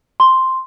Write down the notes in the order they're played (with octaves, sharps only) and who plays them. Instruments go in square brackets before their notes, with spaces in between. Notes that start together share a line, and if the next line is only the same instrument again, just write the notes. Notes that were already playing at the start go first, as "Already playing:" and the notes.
[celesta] C6